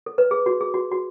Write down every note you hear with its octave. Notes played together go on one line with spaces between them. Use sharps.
A4
B4
G#4
F#4
G#4
F#4
F#4